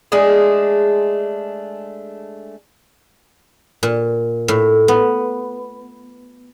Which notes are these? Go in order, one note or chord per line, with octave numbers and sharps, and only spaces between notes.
G#3 A3 D4 G#4
A#2
A2
B3